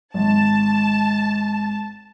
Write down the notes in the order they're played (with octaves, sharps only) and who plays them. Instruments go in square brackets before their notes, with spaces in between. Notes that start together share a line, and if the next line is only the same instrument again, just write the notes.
[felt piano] G#1 [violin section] A5